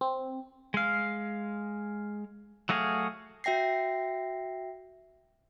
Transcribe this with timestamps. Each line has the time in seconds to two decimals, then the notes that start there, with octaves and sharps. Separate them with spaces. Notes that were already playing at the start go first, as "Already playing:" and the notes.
0.01 C4
0.74 G#3 F5
2.69 F#3 A3 F#4 G#4 F5
3.44 F#4 E5 G5 A#6 C7